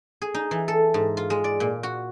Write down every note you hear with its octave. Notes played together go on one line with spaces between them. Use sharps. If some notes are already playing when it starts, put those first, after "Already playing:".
G#4
D#4
E3
A4
G#2
F4
G#3
D5
A#2
F#4